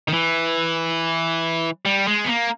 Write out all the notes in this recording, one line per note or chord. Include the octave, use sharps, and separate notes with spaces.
D#3
E3
G3
G#3
B3
A#3